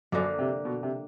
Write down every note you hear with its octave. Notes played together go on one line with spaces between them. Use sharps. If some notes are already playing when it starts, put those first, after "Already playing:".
F#2 D3 F3 A#3
C3
B2
C3